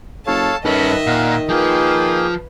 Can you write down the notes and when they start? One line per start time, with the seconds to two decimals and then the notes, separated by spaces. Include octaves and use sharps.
0.27 F#1 A4 C#5 F5 A5
0.65 G2 D#3 C#4 A4 B4 D#5 E5 F#6
1.06 A#2 F5 F#5
1.49 F3 A#3 F4 G#4 B4 G5